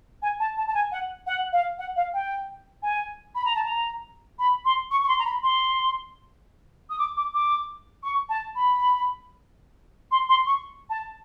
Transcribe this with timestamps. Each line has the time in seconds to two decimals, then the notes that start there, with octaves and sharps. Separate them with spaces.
0.22 G#5
0.40 A5
0.57 A5
0.67 A5
0.74 G#5
0.92 F#5
1.27 F#5
1.53 F5
1.78 F#5
1.96 F5
2.14 G5
2.83 G#5
3.35 B5
3.45 A#5
3.55 A5
3.65 A#5
4.39 B5
4.65 C6
4.91 C#6
5.03 C#6
5.08 C6
5.19 A#5
5.26 B5
5.43 C6
6.90 D#6
6.99 D6
7.17 D6
7.34 D6
8.03 C#6
8.29 A5
8.56 B5
10.11 C6
10.29 C6
10.46 C#6
10.90 A5